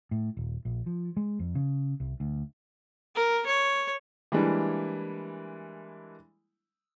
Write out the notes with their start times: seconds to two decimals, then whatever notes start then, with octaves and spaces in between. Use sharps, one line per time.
0.11 A2
0.37 D#1
0.65 A#1
0.86 F3
1.17 G#3
1.39 F2
1.55 C#3
2.00 C2
2.20 D2
3.15 A#4
3.46 C#5
4.32 E3 G3 G#3 A#3 D4 E4